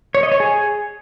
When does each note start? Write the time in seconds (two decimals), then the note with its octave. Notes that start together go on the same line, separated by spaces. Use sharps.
0.15 C#5
0.23 D#5
0.32 C#5
0.40 G#4